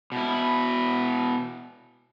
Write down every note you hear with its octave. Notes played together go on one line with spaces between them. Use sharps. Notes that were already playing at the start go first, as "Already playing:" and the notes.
B2 E4